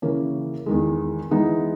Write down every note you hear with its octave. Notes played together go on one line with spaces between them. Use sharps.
C#3 E3 A#3 C#4
E2 D#3 G#3
E3 G#3 B3 D#4